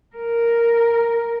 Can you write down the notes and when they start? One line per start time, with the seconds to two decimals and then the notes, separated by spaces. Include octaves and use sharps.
0.17 A#4